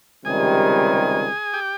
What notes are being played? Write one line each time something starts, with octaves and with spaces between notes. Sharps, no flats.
C#2 C3 D#3 G3 G#4 G#5
G4 G5